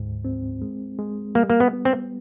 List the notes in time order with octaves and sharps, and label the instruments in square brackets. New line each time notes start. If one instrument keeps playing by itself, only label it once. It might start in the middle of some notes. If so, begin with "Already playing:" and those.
Already playing: [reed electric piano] D2 G#2
C4
G#3
G#3
[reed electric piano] G3 [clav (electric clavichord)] A#3
[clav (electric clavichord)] A#3
B3
[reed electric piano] B3
[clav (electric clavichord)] C4